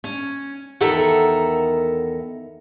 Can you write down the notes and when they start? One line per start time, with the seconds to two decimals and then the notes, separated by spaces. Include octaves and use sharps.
0.04 C#4
0.81 E2 D#3 A4 A#4 E5 F#5